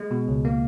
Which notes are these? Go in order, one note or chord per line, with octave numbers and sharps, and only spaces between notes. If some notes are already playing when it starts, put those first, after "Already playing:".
Already playing: G#3
B2
C#2
A#3